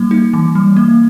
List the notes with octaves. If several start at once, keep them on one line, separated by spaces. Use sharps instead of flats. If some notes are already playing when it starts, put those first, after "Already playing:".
Already playing: G3 A#3
D#4
E3
G3
A#3